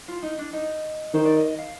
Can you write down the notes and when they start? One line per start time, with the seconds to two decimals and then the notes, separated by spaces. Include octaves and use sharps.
0.08 F4
0.23 D#4
0.38 D4
0.53 D#4
1.14 D#3 C5
1.25 D5
1.37 D#5
1.48 D#5
1.59 F5